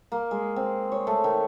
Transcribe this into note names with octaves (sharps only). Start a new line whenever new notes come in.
A#3
G#3
C4
C#5
A3
D#3